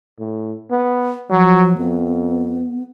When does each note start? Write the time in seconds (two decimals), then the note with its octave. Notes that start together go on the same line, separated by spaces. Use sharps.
0.20 A2
0.71 B3
1.30 F3 F#3
1.78 F2 B3